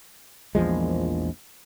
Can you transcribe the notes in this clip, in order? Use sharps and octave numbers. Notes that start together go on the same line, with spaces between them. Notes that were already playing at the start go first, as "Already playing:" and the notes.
A#1 E2 F3 G#3